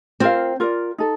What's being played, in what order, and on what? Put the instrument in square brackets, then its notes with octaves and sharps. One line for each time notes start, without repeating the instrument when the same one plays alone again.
[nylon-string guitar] C4 [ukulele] F4 A#4 F5
[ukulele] F4 A#4 D5
D#4 A4